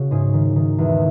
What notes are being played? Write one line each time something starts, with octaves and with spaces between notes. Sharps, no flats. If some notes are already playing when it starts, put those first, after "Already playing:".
Already playing: C#3 F#4
G#2 G#4
D#3
D#3
E2